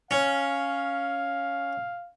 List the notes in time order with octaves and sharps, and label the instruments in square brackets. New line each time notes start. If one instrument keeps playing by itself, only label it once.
[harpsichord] C#4 [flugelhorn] F5